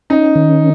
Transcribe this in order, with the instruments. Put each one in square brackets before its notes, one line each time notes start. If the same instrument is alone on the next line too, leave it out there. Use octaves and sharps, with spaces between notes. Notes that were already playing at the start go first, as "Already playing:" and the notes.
[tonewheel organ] C#4 [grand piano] D#4
[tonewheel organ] D#3